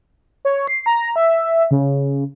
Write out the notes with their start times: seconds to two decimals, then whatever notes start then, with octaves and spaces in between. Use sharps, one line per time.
0.45 C#5
0.67 C7
0.86 A#5
1.16 E5
1.71 C#3